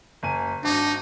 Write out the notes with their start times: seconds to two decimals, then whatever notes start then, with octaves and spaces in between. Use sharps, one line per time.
0.23 F#1 G#5 D#7
0.64 G#1 D4 D#4 F#4